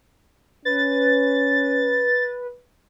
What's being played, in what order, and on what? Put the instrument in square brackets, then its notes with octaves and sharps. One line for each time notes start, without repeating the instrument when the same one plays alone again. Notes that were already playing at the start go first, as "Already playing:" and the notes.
[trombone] C#4 [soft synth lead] B4 [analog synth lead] A6